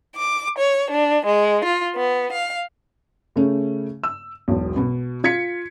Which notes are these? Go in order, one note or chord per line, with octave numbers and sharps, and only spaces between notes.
D6
C#5
D4
G#3
F4
B3
F5
C#3 A3 C#4
E6
E1 B1
B2 B3
F4 G#6 B6 C#7